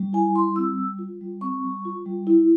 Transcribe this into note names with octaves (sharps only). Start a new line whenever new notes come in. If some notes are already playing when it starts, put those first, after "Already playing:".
Already playing: G3
E4 G#5
G3 C6
C4 E6
G3
F4
G3
C4 C#6
G3
F4
G3
E4